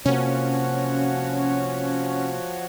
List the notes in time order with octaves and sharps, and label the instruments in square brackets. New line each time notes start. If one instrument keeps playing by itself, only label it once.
[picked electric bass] C3 A#3 [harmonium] F3 F#4 C#5 [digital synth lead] C#4